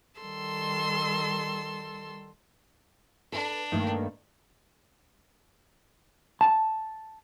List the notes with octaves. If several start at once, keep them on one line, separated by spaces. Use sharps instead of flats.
D#3 G3 A4 C6 E6
D4 A4 B4
G2 D#3 A3 A#3 A4
A5